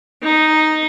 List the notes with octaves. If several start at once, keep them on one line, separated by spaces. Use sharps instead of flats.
D#4